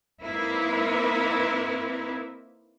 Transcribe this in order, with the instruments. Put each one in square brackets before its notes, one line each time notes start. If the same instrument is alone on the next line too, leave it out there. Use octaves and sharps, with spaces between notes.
[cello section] A#3 C4 D#4 E4 A#4 B4